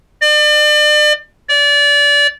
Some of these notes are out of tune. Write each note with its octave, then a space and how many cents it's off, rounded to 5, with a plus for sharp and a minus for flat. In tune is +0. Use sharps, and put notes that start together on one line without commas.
D5 +35
D5 -25